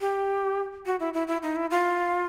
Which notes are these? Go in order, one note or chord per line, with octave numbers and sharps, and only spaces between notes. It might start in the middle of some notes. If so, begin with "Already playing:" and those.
G4
F#4
E4
E4
E4
D#4
E4
F4